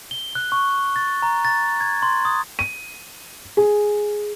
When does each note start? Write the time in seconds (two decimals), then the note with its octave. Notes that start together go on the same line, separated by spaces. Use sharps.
0.11 G7
0.35 F#6
0.52 C#6
0.96 A6
1.22 A#5
1.45 A6
1.81 G#6
2.03 C6
2.25 D#6
2.59 D#7
3.57 G#4